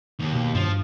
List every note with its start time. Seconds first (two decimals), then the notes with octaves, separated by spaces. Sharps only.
0.19 D#2
0.33 B2
0.54 G2 F3